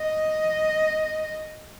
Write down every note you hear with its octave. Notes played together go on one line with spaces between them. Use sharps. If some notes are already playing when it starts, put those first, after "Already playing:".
Already playing: D#5